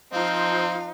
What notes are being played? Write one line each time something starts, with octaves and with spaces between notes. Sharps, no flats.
F3 C4 D#4 F4 F5